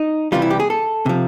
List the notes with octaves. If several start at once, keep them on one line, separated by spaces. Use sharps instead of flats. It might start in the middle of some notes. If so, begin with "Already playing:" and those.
Already playing: D#4
C3 E3 G3 F4
E4
G4
G#4
A4
C3 F3